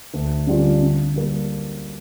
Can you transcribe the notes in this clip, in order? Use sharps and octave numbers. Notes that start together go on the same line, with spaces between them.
D2
D3 G3 C#4 F4
D3
G3 A#3